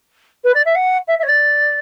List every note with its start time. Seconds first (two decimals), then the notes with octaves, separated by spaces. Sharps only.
0.44 B4
0.54 D5
0.65 E5
0.75 F#5
1.07 E5
1.18 E5
1.23 C#5
1.28 D5